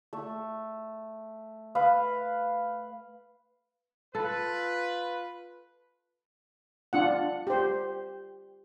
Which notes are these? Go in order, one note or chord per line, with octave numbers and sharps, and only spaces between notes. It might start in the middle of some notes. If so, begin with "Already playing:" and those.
A3
B4 F5
F4 A4 B4
D4 F4 F#5
G4 C5